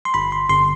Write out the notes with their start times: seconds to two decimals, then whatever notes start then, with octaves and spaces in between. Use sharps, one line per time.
0.05 C6
0.14 G1 B5
0.32 C6
0.49 G1 C6